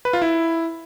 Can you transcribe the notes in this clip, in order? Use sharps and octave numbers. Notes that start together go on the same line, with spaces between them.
B4
F4
E4